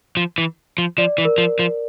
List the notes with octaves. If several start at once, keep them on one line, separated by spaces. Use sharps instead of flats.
F3
E3
F3
F3 D5
E3
A#4
F3
F3